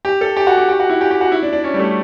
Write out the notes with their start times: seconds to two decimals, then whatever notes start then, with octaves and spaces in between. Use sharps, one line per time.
0.05 G4
0.21 A4
0.37 G4
0.47 F#4
0.58 G4
0.68 G4
0.80 F#4
0.90 E4
1.01 G4
1.11 G4
1.21 F#4
1.32 E4
1.43 D4
1.53 D4
1.64 C#4
1.74 G3
1.79 A3